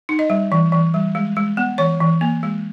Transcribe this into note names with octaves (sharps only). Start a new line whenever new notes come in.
D#4
D#5
G3
E3
E3
G3
G#3
G#3
B3
E3 C#5
E3
A#3
G#3